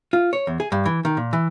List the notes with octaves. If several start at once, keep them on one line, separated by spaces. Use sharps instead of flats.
F4
C#5
E2
G#4
G2
E3
D#3
A#2
E3